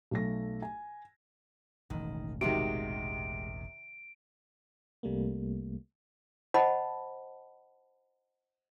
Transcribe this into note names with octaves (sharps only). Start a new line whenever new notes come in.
B1 A3 A#6
G#5
E1 A1 D#3
C3 D#3 G#3 F#4 G4 D7
C2 C3 G3 A3 A#3
C5 D#5 F#5 A5 B5